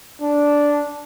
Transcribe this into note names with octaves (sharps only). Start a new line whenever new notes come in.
D4